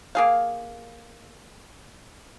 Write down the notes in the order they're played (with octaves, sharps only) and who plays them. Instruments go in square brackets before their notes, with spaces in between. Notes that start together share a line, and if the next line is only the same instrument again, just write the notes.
[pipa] A#3 G#4 F5